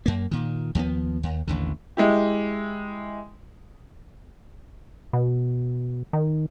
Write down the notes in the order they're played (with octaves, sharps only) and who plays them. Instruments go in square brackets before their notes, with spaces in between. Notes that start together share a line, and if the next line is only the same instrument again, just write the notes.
[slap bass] F#2 A#3
A#2 D#3
D#2 F3 G#3 B3
D#2
A1 D#2 D3
[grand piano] G#3 E4 G4
[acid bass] B2
D#3